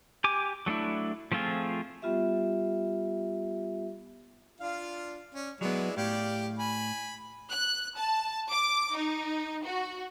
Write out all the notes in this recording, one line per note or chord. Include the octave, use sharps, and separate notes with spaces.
G4 G#5 D6
F#3 A3 D4 E4
F3 A3 C4 F4 G#4
G3 B3 F4 G4 E5
D4 F4 F5
C#4 D5
F#3 G#3 B3 E4 D5
A2 G4 D5 F5
G#5 B5
F#6
A5
D6
D#4
F#4